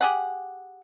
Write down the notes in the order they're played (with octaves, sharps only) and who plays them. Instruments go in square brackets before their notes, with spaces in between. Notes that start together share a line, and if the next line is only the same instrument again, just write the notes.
[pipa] G4 G#4 F#5